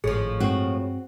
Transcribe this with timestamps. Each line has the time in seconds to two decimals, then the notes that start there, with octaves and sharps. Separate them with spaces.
0.04 G#1 A2 F3 G#4
0.40 G2 G#3 C4 F#4